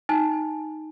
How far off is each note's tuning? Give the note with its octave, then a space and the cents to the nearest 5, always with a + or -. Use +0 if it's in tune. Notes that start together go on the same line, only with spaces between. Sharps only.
D#4 +0 G#5 +0